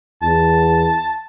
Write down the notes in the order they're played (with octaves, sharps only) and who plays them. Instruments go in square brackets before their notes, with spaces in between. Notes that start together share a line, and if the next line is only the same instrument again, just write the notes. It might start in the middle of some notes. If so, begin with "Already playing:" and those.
[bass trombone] E2 [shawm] A5